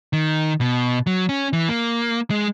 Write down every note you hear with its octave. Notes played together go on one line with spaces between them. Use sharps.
D#3
B2
F#3
C#4
E3
A#3
G#3